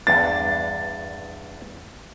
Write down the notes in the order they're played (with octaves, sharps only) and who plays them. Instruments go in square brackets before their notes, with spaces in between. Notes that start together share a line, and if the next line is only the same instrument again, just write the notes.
[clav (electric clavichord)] E2 G2 D4 [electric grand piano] A6